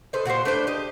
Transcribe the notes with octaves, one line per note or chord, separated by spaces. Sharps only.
A4 B4 C5 D#5
A#2 F#4 G4 C5
A3 D4 B4 C5
G4 D#5